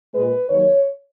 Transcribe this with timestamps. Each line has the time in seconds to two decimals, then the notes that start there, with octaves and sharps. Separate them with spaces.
0.14 A#2 G#3 B4
0.49 D#2 D#3 F#3 C#5